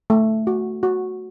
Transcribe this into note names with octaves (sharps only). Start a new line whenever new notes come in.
A3
F#4
F#4